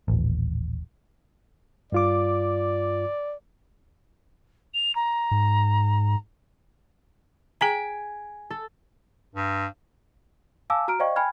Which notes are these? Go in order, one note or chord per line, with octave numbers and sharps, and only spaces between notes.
D#1 A1
G2 F4 D5 D6
F7
A#5
G#2
G#4 G5 G#5 A#5 B6 D7
A4
G2
F5 G#5 A5 D6 E6
F#4 A#5 F6 D7
C5 D5 D#5 F5 G5 C#6
G5 G#5 B5 F6 G#6